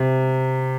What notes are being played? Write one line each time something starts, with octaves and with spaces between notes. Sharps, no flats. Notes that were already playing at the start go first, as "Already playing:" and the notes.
Already playing: C3